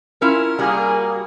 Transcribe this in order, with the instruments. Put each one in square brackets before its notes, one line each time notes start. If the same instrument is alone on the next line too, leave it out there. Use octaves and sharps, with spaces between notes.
[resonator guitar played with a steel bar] C#4 E4 F4 [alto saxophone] A#4
[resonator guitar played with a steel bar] G3 F#4 [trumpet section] A#3 G#4